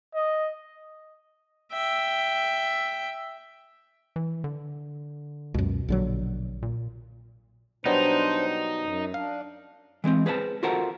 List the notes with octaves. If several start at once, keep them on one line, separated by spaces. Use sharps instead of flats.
D#5
E5 G5
E3
D3
C#2 F#2 B2
A#1 D3 F#3
A#2
B2 F#3 G3 D4 D#4 C5
F#2
D4 F5
E3 G#3 A3 C4
G#4 B4 C5 F5 A5
F4 F#4 A4 A#4 C5 F#5